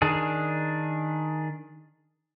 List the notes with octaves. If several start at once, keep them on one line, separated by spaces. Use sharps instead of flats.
D#3 D4 G#4